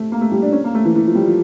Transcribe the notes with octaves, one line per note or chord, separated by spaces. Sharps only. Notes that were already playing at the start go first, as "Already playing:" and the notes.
Already playing: A3
A#3
A3
G3
D4
C#4
A#3
A3
E3
E3
F3
G3
F3